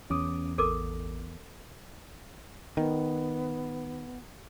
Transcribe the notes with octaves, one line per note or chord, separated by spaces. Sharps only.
E2 C#4 D6 D#6
A1 A4 A#4 D6
D#3 B3